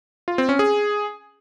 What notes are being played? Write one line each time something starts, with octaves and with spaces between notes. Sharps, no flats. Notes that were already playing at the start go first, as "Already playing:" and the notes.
F4
C4
C#4
G#4